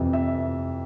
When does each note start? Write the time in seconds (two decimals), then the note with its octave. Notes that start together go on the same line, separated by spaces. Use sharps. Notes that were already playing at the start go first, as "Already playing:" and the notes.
Already playing: F2 C3 E3 E5
0.13 E5